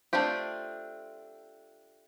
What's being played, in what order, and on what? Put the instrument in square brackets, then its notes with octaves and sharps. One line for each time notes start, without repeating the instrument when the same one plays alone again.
[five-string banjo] A3 C4 D4 F4 G4